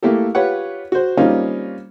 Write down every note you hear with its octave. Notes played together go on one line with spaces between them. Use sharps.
A3 A#3 E4 G4 A4
F4 G4 B4 C#5 F#5
F#4 C5
G3 A#3 C4 C#4 D#4 F4